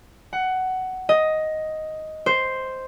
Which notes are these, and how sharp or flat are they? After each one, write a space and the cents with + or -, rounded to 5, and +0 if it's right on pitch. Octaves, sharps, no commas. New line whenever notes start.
F#5 +15
D#5 +5
C5 +0